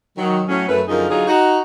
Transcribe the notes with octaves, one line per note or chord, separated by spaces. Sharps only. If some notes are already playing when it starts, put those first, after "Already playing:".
D#3 F#3
A2 F#3 C#4
F#2 A3 B4
F#2 D3 F3 D#4 G#4 A#4
D3 F#3 D#4 F4 G#4
D#4 F#4